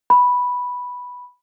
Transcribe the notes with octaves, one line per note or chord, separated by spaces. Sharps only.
B5